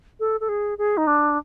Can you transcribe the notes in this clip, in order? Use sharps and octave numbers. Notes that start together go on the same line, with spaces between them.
A4
A4
G#4
G#4
D#4
D4